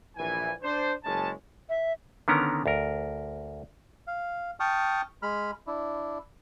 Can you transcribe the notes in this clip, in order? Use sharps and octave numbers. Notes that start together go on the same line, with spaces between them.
A#1 E3 G#5
D4 C5
F#1 G#3 C#4 A5
E5
D3 D#3 B3 C#4 A#4 A#5
D2 A#4
F5
G5 A5 C#6 D#6 F6
G#3 B5 F6
D4 E4